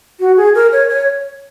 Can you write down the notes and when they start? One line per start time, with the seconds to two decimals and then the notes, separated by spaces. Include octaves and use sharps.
0.20 F#4
0.37 G#4
0.55 A#4
0.72 C#5
0.89 C#5